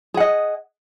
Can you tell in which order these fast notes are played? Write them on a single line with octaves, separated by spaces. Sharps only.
G#4 F#5 D#5